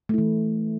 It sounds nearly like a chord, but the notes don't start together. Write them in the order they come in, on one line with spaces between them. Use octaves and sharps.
A3 E4 E3